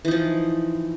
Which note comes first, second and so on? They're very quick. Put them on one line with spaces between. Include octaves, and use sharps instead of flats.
E3 D#4 F3